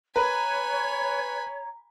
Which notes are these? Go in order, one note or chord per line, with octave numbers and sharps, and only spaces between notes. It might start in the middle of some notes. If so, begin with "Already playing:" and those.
B4 C#5 G#5 A#5 B5